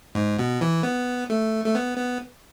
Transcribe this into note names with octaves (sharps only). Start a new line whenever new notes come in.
G#2
B2
E3
B3
A3
A3
B3
B3